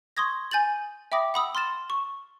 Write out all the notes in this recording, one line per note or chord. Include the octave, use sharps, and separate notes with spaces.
C6 C#6 D#6 G#6 A#6
G#5 G6 A6 F#7
E5 G5 B5 D6 D#6 A#6
F#5 B5 D#6 E6
C6 F6 A6 E7
C#6